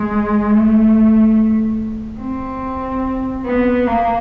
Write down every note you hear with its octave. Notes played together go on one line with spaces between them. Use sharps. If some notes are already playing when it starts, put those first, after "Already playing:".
Already playing: G#3
A3
C4
B3
A#3